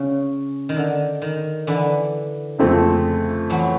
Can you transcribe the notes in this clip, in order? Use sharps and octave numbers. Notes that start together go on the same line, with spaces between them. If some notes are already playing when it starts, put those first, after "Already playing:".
Already playing: C#3
D#3
D3
D#3
D3 E3
F2 C#3 F3 A3 C4
E3 F#3